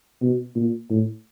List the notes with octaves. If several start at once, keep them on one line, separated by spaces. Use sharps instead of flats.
B2
A#2
A2